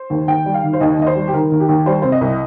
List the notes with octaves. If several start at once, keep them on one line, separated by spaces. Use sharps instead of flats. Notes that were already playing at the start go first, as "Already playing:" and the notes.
Already playing: C5
D#2
D#2 G5
G3
F5
D#3
C5
D#2 D#5
D#2 D#5
C5
G3
G4
D#3 A#4
D#2
G4
D#2
G3 C5
C3 C5
D#5
C2